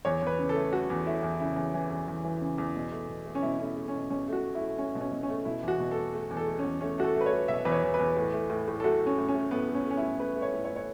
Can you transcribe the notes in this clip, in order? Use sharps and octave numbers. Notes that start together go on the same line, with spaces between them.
E2 C#5
E2 B4
C#3
A4
A3
A3 F#4
E2
A3 E4
E2
C#3 E4
E2
E3
E2
E2
E3
C#3
E2
B2
A3
B2
A3
C#4
B2 E4
A3 C#4
E4
A3
C#4
B2
B2 C#4
A3 F#4
A3
E4
A3
A3 C#4
B2
C#4
B2
C#4
A3
B2 E4
E2 F#4
B2
A3 A4
A3
E2
A4
A3
C#4
E2
A3 C#4
A3 F#4
A4
A3
B4
C#5
A3
B2 E5
E2 B4
C#5
E2
B4
E2
A2
A3
A2
A2
A4
A3 F#4
A3
C#4
A2
C#4
A3
A2 B3
A3
C#4
A3
C#4
E4
A2
A3 B4
A3
C#5
A2
C#5
A2
C#5